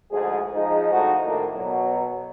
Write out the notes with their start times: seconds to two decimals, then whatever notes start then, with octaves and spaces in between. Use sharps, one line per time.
0.11 D2 G#2 F3 G#4
0.55 F3 G#3 D#4
0.91 A2 D3 F3 D#4 F#4
1.25 A2 D#3 A#3 D4
1.55 B2 F#3